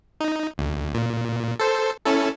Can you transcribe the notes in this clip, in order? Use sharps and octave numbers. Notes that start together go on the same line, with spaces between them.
D#4
D2
A#2
A4 C5
C#4 E4 A4